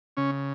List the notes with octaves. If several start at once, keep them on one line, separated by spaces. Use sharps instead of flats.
C#3 C#4